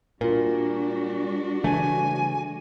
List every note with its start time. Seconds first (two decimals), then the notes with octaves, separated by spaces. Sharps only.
0.21 A#2 G3 D4 F4 F#4 A#4
1.64 C#3 E3 A3 G#5